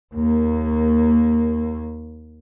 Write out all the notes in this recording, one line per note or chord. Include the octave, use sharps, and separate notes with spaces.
D#2 A#3